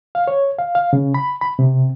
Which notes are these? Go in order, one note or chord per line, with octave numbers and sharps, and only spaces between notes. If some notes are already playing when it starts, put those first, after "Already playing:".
F5
C#5
F5
F5
C#3
B5
B5
C3